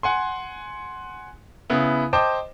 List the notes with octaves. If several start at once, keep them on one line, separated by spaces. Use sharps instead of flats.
F#5 G#5 C6
C#3 B3 E4
C5 D#5 G5 A5 D6